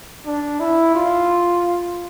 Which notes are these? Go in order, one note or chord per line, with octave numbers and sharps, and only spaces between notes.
D4
E4
F4